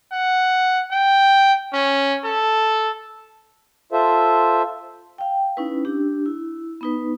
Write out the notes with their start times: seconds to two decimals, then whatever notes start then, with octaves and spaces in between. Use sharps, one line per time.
0.12 F#5
0.91 G5
1.73 C#4
2.24 A4
3.92 F4 A4 C5 E5
5.18 F5 G5
5.57 C#4 D#4 E4 B4
5.85 D4 G4
6.26 E4
6.81 B3 D#4 B4